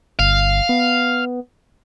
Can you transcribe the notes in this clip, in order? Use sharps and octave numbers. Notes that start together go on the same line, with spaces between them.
G1 F5
B3